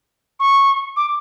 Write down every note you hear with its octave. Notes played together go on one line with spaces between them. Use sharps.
C#6
D6